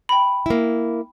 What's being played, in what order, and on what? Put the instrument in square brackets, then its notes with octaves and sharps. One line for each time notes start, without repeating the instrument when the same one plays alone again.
[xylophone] G5 B5
[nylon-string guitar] A#3 E4